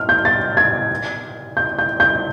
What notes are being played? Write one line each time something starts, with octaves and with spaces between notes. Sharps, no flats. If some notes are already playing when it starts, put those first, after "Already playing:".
Already playing: F6
G6
A6
G#6
G6
G6
G6